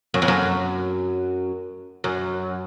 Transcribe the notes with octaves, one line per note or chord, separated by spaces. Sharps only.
F#2
F2
F#2
F#2